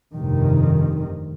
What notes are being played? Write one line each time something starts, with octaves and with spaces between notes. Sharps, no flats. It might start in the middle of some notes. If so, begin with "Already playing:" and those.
F1 G2 C3 D#3